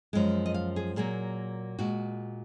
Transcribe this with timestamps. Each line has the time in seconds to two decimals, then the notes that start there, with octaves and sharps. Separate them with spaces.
0.13 F#2 F3 G#3
0.46 D#5
0.54 F5
0.76 G#4
0.96 A#2 F#3 A#3 G#4
1.79 A#2 G#3 F#4